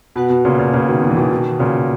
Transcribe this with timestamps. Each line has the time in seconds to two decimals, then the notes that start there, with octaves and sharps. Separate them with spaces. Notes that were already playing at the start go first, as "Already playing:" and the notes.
0.16 B2 B3 F#4 B4 F#5
0.30 B2
0.45 A#2 C#3
0.59 A#2
0.74 A#2 C#3
0.89 B2 D#3
1.02 B2 D#3
1.10 E3
1.17 B2 D#3
1.31 B2 D#3
1.59 A#2 C#3